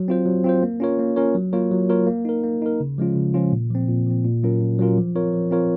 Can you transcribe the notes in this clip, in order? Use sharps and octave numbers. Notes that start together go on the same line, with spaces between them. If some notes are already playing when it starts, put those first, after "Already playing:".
Already playing: F#3
C4 F4 C5
F#3
C4 F4 C5
A#3
C#4 F4 A#4 C#5
A#3
C#4 F4 A#4 C#5
F#3
A#3 F4 A#4 C#5
F#3
A#3 F4 A#4 C#5
A#3
D#4 A#4
A#3
D#4 A#4
C#3
F3 G#3 C#4 F4
C#3
F3 G#3 C#4 F4
A#2
F3 C4
A#2
F3 C4
A#2
F#3 C#4 F4 A#4
A#2
F#3 C#4 F4 A#4
F3
C4 F4 A#4 C#5
F3
C4 F4 A#4 C#5